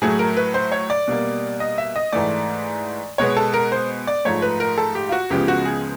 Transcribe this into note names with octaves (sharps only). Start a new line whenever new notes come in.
A2 F#3 A3 G#4
A#4
B4
C5
C#5
D5
B2 G3 A#3
D#5
E5
D#5
G#2 E3 A3 D5
B2 G#3 B3 C#5
A4
A#4
C5
D5
G#2 F3 A3 C#5
B4
A#4
A4
G4
F4
F#4
C#2 C#3 F3 G#3 B3 G4
F#4
G#4